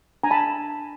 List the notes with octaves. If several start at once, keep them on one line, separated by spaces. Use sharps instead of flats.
D4 G#5 A#5
A5 B5